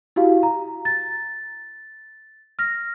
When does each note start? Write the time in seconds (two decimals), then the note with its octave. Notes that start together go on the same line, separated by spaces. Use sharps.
0.16 E4 F#4 G4 F5
0.43 A#5
0.85 A6
2.59 F6 A#6